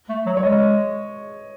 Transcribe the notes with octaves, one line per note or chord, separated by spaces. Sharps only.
A3
F#3
C#5
G#3 D#5